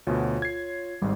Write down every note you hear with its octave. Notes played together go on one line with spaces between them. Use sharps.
D2 B2 F4 C#5
G#6 C7
G#1 G#2 G3